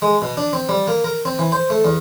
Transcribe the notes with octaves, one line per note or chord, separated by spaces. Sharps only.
G#3
B2
D4
C4
G3
A#3
A#4
C4
E3
C5
A3
E2